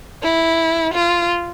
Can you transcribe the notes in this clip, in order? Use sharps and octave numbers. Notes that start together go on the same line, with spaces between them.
E4
F4